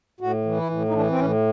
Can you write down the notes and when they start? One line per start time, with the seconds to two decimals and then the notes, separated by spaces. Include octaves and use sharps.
0.21 A2 F#4
0.45 E3
0.57 E4
0.70 A2
0.88 D#4
0.94 E3 D4
1.10 C4
1.19 A2 C#4